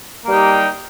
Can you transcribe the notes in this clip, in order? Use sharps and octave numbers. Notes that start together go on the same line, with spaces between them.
G3 A#3 D#4 G4